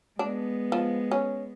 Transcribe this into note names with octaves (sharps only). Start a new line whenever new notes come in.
G#3 B3 D4
F3
C#4